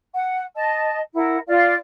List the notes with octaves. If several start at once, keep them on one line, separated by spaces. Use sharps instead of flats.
F#5
D#5 A5
E4 A#4 F#5
F4 D5 F5